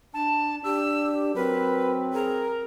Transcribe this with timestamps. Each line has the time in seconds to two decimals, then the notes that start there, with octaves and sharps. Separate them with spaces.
0.14 D4 A5
0.64 D4 G4 E6
1.35 F#3 C4 A#4 B4
2.13 G#4 A#4